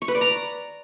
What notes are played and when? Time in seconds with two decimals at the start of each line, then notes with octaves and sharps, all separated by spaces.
0.02 C#6
0.08 B4
0.15 D5
0.21 A#5